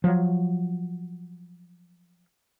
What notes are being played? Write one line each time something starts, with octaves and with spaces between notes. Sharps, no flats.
F3 F#3